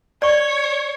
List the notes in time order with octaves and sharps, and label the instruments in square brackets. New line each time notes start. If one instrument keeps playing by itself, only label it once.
[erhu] C#5 [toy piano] D5 C#6